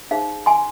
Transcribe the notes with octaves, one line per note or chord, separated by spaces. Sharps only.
D#4 G#4 C5 F5
G#5 C6